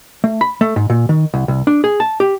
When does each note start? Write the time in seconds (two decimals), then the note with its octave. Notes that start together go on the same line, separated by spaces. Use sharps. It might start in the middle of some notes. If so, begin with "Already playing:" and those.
0.24 A3
0.41 B5
0.61 A3
0.76 G#2
0.90 A#2
1.09 D#3
1.34 C2
1.48 C2
1.67 D4
1.84 G#4
2.00 A5
2.20 G4